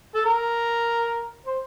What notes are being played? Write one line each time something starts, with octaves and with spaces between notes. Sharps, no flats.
A4
A#4
C5